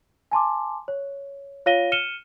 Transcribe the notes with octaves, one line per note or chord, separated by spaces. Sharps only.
G#5 A5 C6 D6
C#5
F4 C#5 F5 A#6 D#7 G7
F6 C#7 D#7 E7 G7